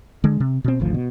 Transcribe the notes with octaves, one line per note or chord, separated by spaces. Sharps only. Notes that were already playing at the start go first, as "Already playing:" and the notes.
D3 G#3
C3
B2 C4
G#1 D2 F3
B2